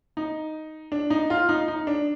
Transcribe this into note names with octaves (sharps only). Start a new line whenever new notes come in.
D#4
D4
D#4
F4
D#4
D#4
D4